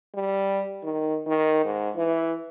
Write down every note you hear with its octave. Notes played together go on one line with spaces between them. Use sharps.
G3
D#3
D#3
G#2
E3